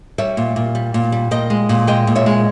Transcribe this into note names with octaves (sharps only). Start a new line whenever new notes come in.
G3 C#5 E5
A#2
A#2
G3
A#2
G3
A#2 D#5 G5
G#3
A#2
G#3 D#5 G5
A#2
C#5 E5
G#3